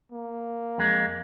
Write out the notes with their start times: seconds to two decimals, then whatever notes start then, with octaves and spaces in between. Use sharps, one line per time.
0.12 A#3
0.78 F2 G#3